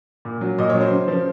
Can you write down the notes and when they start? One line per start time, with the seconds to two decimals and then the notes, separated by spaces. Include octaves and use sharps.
0.25 A#2
0.41 F#3
0.58 A#2 D#5
0.69 C#5
0.75 F#3
0.81 C5
0.92 C#3
1.08 F3